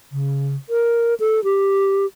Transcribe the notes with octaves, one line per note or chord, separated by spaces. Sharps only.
C#3
A#4
A4
G4